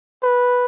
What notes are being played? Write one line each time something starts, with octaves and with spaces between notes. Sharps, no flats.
B4